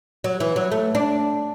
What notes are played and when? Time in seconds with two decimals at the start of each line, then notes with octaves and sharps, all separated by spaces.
0.24 F#3
0.40 E3
0.56 F#3
0.72 A3
0.95 D4